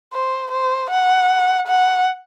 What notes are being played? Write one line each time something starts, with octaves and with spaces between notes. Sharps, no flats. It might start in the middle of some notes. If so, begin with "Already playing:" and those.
C5
C5
F#5
F#5